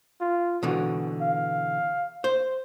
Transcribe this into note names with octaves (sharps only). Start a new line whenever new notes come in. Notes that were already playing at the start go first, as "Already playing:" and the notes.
F4
B2 D3 E3 F#4
F5
C5